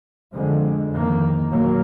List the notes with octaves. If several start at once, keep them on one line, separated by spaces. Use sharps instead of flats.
F2 D3 F3 G#3
F2 D#3 A#3
A#2 F#3 A#3